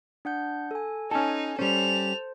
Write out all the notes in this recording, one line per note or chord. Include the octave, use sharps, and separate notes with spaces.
D4 F#5 G6
A4 G#5
C#4 D#4 A4 G#5
G3 C#4 A4 C5 F7